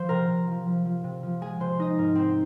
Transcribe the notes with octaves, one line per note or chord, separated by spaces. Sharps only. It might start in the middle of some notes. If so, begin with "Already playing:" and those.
Already playing: F3 C5 C6
C3 A#4 A#5
C3
F3
F3
F3
C3
F3
G#3 G#4 G#5
C3 C5 C6
G#3 D#4 D#5
G#2 A#4
C4 D#4 C5